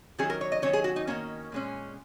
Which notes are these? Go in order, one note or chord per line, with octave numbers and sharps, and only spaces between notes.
D#3 F#3 C#4 G#4
A#4
C#5
D#5
D#3 F#3 C#4 C#5
G#4
F#4
D#4
D#3 F#3 A#3 C#4
A#2 G#3 C#4